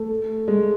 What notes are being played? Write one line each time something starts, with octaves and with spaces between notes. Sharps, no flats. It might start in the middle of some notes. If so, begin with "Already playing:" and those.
Already playing: A3
G#3